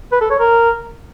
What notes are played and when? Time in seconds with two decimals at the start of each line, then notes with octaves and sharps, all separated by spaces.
0.12 B4
0.21 A4
0.30 C#5
0.40 A#4